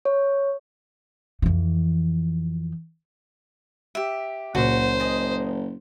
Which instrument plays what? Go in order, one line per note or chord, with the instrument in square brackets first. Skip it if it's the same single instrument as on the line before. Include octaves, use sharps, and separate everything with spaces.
[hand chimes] C#5
[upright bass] F2 E3
[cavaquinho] G4 E5
[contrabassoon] F#1 [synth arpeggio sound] C#2 A#2 [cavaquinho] F#4 [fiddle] C5
[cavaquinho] G#4 D#5